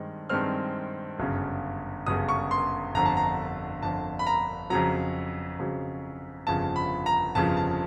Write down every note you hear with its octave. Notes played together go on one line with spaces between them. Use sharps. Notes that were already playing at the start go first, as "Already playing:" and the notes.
Already playing: G2 D#3 G#3 C4
G2 D#3 G#3 C4 F6
G1 F#2 C#3
G1 F#2 C#3 D#6
C#6
C6
G1 F2 D3 A#5
A5
A#5
G1 F2 D3 A5
B5
A#5
F2 C#3 F#3 A#5
F2 C#3 F#3
G1 F2 C#3 F3 A5
B5
A#5
G1 F2 C#3 F3 A5
A5